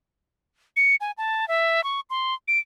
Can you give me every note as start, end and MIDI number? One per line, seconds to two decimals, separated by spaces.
0.76 0.95 97
1.01 1.11 80
1.18 1.47 81
1.48 1.84 76
1.84 2.00 85
2.10 2.34 84
2.48 2.59 98